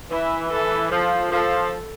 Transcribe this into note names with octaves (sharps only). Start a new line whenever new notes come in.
E3 E4
A4
F3 A4
F3 A4